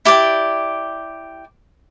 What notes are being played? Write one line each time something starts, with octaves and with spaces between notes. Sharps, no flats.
E4 G4 D5 G5